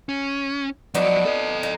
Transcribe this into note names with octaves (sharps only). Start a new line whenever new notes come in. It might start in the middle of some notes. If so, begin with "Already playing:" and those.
C#4
F3 F#3 B3 D4 D#4
A4 D#5
D#4